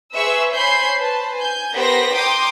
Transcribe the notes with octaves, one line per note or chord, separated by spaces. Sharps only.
G#4 B4 C5 E5 C#6 E6
C5 C#5 G#5 B5 G6 C7
B4 C5 A5
G#5 G6
B3 G4 A#4 C5 A#6 B6
G5 A#5 C6 D6 D#6 G6